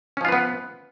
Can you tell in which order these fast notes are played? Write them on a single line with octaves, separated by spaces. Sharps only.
C#4 F3 F4 B4 B3